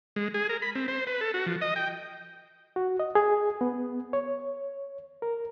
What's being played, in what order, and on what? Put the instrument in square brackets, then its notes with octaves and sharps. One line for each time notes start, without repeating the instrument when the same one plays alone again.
[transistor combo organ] G#3
G#4
A#4
B5
C4
C5
B4
A4
F#4
F3
D#5
G5
[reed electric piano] F#4
D#5
G#4
B3
C#5
A#4